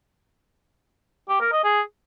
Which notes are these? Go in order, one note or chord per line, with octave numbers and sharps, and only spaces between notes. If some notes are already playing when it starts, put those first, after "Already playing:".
G4
A#4
D#5
G#4